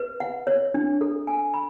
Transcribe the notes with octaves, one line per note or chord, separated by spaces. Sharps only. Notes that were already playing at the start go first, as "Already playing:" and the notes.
Already playing: B4
F#5
C#5
D4
A4
G#5
B5